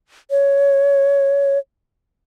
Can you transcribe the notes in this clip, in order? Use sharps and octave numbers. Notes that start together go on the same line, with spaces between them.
C#5